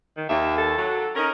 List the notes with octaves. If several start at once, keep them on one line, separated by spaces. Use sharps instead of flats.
D#3
D#2 E5
A4
F#3
C#4 D#4 A#4